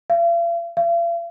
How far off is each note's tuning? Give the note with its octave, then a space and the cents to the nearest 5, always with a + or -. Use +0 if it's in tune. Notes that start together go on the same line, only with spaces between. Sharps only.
F5 -45
F5 -45